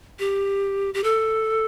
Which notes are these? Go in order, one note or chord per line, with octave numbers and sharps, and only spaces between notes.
G4
G4
A4